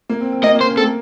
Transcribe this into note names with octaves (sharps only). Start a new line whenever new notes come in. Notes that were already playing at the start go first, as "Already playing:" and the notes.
A#3
C4
C4
A#3 D#5
A#3
C5
C#4
C4 A4
A#3